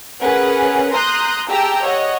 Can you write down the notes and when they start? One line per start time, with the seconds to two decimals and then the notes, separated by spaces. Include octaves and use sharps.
0.20 C#4 G#4 A#4 B4 F#5
0.92 A#5 C6 D#6 F#6 G6
1.49 G4 G#4 G5 A5 A#5 E6
1.84 C#5 D#5 F#5